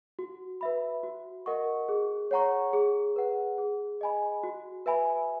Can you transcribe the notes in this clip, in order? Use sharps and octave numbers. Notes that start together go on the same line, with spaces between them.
F#4
B4 E5 B5
F#4
A#4 D#5 F#5 C#6
G#4
C#5 F#5 A#5 C#6
G#4
B4 F#5
G#4
D#5 G#5 B5
F#4
B4 E5 G#5 B5